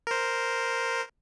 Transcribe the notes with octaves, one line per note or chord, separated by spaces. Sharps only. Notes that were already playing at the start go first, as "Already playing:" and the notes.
A#4 C5